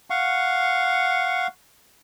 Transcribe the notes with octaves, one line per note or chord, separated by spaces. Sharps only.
F5 F#5 C#6